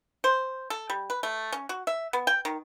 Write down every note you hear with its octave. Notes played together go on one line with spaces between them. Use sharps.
C5
A4
G3
B4
A3
C#4
F#4
E5
B3
G5
D#3